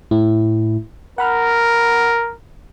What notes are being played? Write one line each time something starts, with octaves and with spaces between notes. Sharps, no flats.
A2 E4
A#4 F#5 B5 F6